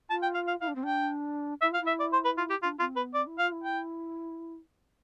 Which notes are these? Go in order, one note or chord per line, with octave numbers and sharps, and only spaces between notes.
F4 A5
G5
F5
F5
E4 F5
D4
C4
D4 G5
E4 E5
F4 F5
E4
E5
D5
C5
B4
F4
G4
D4 F4
C4 F4
B3 B4
C4 D5
E4
F4 F5
E4
G5